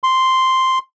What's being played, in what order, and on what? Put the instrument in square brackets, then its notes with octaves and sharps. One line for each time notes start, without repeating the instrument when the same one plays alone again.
[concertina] C6